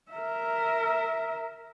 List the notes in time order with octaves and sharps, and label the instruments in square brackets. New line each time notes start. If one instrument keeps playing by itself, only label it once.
[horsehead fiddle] A#4 E5